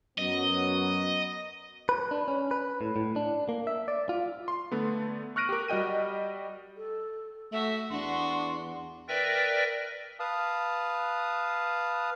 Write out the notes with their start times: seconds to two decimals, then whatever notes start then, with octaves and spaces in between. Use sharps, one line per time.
0.18 F#2 F#3 B3 D#5
1.89 B4
2.11 D4
2.28 C#4
2.51 B4
2.81 A2
2.96 A2
3.16 D4
3.49 A#3
3.67 E5
3.88 D5
4.09 F4
4.48 C6
4.72 D3 A3 B3
5.36 C#6 F6 F#6 A#6 D7 D#7
5.49 G4 A#4
5.68 G3 F#4 D#5 G5 D#7
6.76 A4
7.52 A3 F#4 E5
7.90 E2 D4 F#4 C6
9.08 A#4 B4 D5 E5 G5 A#6
10.20 B4 F5 A5 D#6